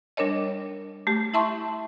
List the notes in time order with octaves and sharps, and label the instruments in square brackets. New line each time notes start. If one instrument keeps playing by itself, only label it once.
[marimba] G3 D4 A#4 C#5 D#5
A3 G4
E4 E5 A5 C6 C#6